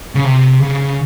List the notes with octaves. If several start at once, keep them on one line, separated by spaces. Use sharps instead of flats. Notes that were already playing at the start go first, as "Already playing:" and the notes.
C#3
C3
C#3